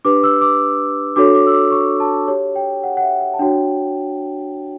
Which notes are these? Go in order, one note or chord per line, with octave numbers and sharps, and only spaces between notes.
D4 G4 B4 D6
E6
D6
D4 F#4 A4 C#5 D6
D6
E6
D6
C#6
A5
G4 C#5
G5
F#5
F#5
E5
F#5
A5
D4 F#4 C#5 G5